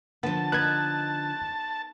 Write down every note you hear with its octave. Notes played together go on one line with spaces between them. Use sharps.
D3 F3 B3 A5
D#4 B4 F#6 G#6